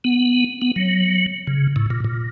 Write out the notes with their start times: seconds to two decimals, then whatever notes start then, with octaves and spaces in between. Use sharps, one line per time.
0.04 B3
0.62 B3
0.76 F#3
1.47 C#3
1.76 A2
1.90 A#2
2.04 A#2